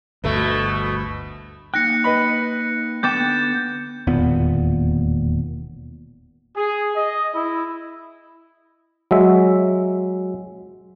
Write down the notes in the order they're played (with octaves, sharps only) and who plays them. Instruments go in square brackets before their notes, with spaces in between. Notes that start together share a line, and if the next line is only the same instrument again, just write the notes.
[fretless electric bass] G1 D2 [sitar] B2 A3
[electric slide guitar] A#3 D#4 G5 [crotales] F#6 A#6 C#7
[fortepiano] B4 D#5 B5
[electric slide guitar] D3 B3 B4 [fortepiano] G5 D6 [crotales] G6 A6 E7
[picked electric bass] E1 D#2 A#2 B3
[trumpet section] G#4
D#5
E4
[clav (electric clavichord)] F#3 G#3 E5